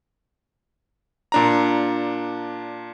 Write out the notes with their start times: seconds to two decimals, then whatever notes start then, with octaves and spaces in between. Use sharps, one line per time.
1.32 A#2 D4 A#5